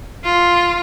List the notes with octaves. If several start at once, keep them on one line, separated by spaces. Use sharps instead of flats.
F4